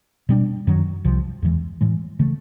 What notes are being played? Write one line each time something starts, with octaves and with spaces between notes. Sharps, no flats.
B2 G3 B3 D4
F#2 D#3 F#3
C2 C3 F3
E2 C#3 E3 G#3
A2 E3 G#3
C#3 E3 A3